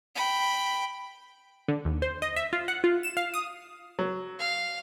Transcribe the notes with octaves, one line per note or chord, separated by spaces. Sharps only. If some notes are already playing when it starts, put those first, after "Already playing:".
G5 B5
D3
D#2
C5
D#5
E5
F4
F#5
F4
E7
F5
D#6
F#3
F5